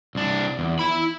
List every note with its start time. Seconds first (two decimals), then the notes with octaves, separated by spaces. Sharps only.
0.15 C2 D4
0.59 E2
0.79 E4 B5